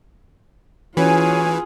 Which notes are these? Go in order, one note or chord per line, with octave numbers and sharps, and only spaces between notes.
E3 C#4 F4 F#4 G#4 B4 C#5 G#5